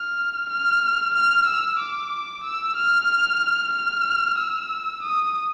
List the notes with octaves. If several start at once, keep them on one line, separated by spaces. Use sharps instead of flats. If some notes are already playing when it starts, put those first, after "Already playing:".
Already playing: F6
F6
F6
E6
D6
E6
F6
F6
E6
D#6